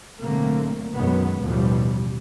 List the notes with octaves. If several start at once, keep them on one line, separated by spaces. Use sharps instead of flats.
B1 A2 D3 A3 A#3 C4
B1 F#2 B2 D#3 G#3 B3
A1 D#2 B2 E3 F3 G3